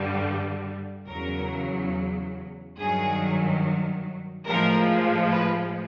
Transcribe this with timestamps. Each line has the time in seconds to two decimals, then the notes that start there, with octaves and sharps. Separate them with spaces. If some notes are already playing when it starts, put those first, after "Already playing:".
Already playing: G2 D3 G3
1.08 E2 C#3 F#3 A#4
2.78 G2 D#3 F#3 G#4
4.47 A2 F3 G#3 A#4
5.32 B4